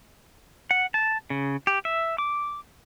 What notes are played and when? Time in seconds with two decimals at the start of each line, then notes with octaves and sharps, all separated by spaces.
0.71 F#5
0.94 A5
1.30 C#3
1.67 G4
1.85 E5
2.18 D6